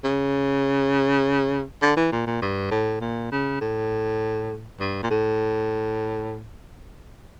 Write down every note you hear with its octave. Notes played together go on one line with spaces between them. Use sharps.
C#3
D3
E3
A#2
A#2
G2
A2
A#2
C#3
A2
G2
A#2
A2